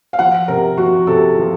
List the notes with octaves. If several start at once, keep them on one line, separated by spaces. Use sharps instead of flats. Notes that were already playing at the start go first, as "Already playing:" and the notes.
F5
F3 F#5
C3 A#4
F3 F#4
C3 A4
F3